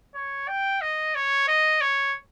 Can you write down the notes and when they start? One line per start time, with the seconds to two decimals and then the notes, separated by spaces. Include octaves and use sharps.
0.15 C#5
0.48 G5
0.81 D#5
1.15 C#5
1.48 D#5
1.81 C#5